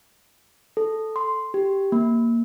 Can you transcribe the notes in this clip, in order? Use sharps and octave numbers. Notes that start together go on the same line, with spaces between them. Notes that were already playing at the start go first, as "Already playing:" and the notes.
A4
C6
G4
A#3